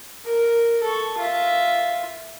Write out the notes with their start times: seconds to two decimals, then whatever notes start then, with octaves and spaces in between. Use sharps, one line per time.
0.25 A#4
0.83 A4 C#6
1.17 F4 E5